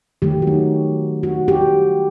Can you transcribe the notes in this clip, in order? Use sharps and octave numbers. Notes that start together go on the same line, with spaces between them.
D#3 F#3 A3 G4
F#4
D#4
F#4
G4